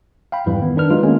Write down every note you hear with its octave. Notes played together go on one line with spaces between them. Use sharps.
F5 G5 B5
F2 G#2 E3 G3
D#3 B3
D#3 D4 B4 F6
F#3 G#3 D#4 F4
D#3 G#3 A#3 B3 C#4